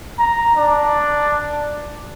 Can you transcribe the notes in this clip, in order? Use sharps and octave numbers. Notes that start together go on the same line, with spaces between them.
A#5
D4